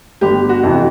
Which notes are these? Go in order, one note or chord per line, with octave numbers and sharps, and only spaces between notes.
G1 G4
F#4
F2 C3 E3
F#4